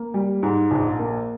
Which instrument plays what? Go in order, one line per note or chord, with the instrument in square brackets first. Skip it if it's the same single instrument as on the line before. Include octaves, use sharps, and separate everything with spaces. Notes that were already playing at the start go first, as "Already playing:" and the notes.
Already playing: [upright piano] A#3
G3
G#2
A#1
A#3